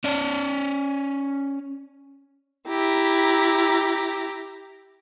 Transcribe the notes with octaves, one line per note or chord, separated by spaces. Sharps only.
C#4 D5
E4 G4 A#5